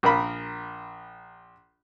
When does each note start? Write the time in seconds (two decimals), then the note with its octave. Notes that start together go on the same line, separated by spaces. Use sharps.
0.03 A#1 A#4 B5